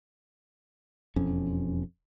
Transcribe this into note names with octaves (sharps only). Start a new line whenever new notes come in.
E1 F2 C#4